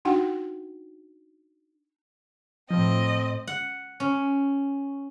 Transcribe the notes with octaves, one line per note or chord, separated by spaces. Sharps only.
D4 D#4 F#4 F#5 G5
A2 F3 C4 D#5
F#5
C#4